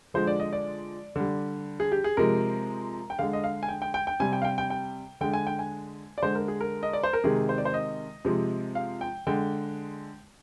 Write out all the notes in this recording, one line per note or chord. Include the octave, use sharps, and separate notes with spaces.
D3 F3 G#3 C5
D5
D#5
D5
D3 G3
G#4
G4
G#4
C3 F3 G#3 A#4
G5
D3 G#3 F5
D#5
F5
G#5
G5
G5
G5
G5
C3 G3 G#5
G5
F5
G5
G5
G5
D3 G#3 G5
G#5
G5
G#5
D5
D3 G#3 C5
A#4
G#4
A#4
D#5
D5
C5
A#4
C3 D#3 G#3 G#4
C5
D5
C5
D#5
C3 F3 G#3
F5
G5
D3 G#3 G5